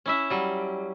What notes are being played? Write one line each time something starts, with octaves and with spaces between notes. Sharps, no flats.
C#4 E4 E5
F#3 G3